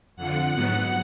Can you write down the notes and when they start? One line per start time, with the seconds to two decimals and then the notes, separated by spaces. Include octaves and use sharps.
0.16 F2 D3 F3 F#5
0.54 G#2 F#3 B3